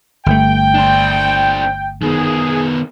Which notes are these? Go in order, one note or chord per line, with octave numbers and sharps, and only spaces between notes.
G1 A3 G5
D4 C5
D#3 B3 G#4